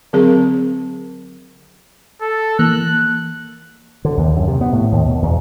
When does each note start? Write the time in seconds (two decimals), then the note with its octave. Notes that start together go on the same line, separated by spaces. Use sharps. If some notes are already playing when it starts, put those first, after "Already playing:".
0.13 D3 F#3 C4 G#4 A#4 A5
2.22 A4
2.59 E3 A#3 F#6
4.05 D3
4.17 D#2
4.36 F#2
4.48 C3
4.61 B3
4.73 A2
4.92 D#2
5.06 B2
5.22 E2